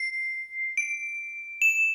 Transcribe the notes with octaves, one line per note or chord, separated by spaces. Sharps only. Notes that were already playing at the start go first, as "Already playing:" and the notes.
Already playing: C7
D7
E7